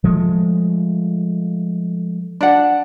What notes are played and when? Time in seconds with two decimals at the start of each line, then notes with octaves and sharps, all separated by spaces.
0.04 F3 G#3 A3
2.41 D4 F#5